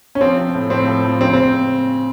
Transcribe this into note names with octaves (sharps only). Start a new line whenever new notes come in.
C#4
F3 C4
F3
A2
A2 C4
F3
F3
C#3 C4
C4